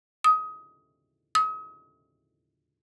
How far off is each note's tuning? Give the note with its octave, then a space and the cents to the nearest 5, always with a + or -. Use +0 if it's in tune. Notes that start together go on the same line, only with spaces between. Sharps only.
D#6 +20
D#6 +40